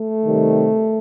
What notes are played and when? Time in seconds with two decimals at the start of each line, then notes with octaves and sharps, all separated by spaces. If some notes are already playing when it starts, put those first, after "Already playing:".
Already playing: A3
0.24 C3 D#3 G3